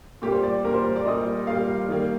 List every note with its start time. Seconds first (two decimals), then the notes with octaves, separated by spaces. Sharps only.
0.22 A#2 G3 A#3 G4
0.32 C5
0.43 D5
0.65 A#2 G3 A#3 A#4
0.74 C5
0.85 C5
0.96 D5
1.05 A#2 G3 A#3 D#5
1.47 A#2 G3 A#3 F5
1.89 D#3 G3 A#3